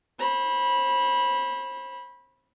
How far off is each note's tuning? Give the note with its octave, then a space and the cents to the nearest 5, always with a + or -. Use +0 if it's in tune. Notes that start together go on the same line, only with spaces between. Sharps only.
C5 +35 B5 -15